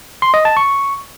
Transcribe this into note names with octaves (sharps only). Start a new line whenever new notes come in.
C6
D#5
A5
C#6